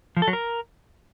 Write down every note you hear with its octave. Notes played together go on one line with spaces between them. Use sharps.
F3
A4
F#3
A#4